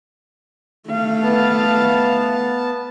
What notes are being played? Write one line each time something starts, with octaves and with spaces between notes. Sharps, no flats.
A3 F5
B3 A5